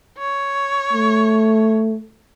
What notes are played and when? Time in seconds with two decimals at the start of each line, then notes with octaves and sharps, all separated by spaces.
0.18 C#5
0.93 A3